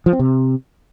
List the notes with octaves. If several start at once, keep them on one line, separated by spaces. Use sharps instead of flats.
F3
C4
C3